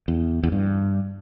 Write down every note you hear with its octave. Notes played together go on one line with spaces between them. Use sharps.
E2
E2
G2